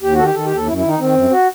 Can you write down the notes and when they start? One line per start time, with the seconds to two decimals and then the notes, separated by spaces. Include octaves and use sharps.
0.02 D#2 G4
0.13 F#4
0.19 D#3 A4
0.24 G4
0.34 D#3 A4
0.45 G4
0.51 D#2 A4
0.67 F#2 E4
0.78 E4
0.83 D#3 D#4
0.99 D#3 C4
1.15 F#2
1.31 F#4